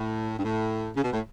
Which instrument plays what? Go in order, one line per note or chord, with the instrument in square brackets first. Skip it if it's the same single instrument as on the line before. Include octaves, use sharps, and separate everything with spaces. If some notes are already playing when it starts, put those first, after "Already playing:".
Already playing: [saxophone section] A2
G2
A2
C#3
B2
A2